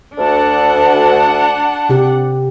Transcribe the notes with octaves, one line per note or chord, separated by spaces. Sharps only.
D2 D4 F#5 A5
C3 G4